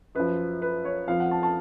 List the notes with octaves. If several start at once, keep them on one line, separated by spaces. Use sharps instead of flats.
F#2 F3 B4
B4
C#5
F2 F3 F5
F#5
A5
A5